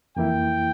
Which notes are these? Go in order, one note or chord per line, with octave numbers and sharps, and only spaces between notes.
F2 E3 A#3 E4 G5